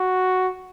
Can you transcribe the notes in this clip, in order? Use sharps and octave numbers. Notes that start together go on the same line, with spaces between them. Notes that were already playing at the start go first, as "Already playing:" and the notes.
Already playing: F#4